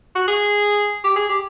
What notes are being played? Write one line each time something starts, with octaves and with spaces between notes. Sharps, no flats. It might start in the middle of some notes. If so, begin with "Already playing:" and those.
F#4
G#4
G4
G#4
G4